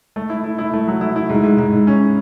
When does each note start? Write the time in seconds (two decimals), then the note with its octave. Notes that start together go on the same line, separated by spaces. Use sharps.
0.16 A3
0.29 E4
0.44 E4
0.58 E4
0.73 A3
0.87 F#3
1.01 E4
1.16 E4
1.29 G#2
1.44 G#2
1.59 G#2
1.73 G#2
1.87 C#4